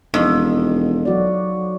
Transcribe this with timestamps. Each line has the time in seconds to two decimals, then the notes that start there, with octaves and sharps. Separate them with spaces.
0.14 E1 F2 D#4
1.05 F#3 F#4 D5